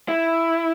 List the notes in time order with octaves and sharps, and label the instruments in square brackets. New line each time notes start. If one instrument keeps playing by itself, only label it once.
[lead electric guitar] E4